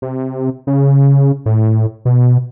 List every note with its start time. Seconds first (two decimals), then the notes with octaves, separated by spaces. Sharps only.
0.02 C3
0.67 C#3
1.46 A2
2.05 B2